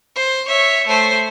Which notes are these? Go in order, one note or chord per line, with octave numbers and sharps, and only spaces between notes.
C5
C#5 E5
A3 C5